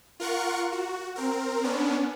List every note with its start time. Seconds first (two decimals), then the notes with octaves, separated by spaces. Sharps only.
0.20 F4 A#4 F#5 C#6
0.72 F#4
1.16 C4 A#4
1.63 B3 C#4 D4